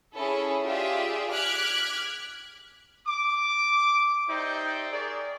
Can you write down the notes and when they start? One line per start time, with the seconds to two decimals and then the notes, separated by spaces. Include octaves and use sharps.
0.16 C#4 E4 G#4 A4
0.64 F4 G4 G#4 D5 E5
1.30 D6 F6 F#6 G#6 B6
3.07 D6
4.28 D#4 G4 C5 D5 E5 G5
4.91 G#4 A#4 C#5 D5